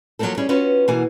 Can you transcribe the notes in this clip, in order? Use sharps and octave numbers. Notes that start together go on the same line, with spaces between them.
F3 F#3 A3 A#3 C4 A4
G3 C#4 E4 G#4
B3 C#4 F4 F#4 B4
B2 E3 A#3 F#4 G#5